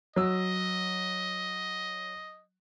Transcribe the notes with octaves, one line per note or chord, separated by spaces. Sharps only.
F#3 D#5 E6